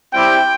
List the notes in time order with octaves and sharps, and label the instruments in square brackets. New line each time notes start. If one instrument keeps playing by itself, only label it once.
[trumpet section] G3 C4 E4 G4 G5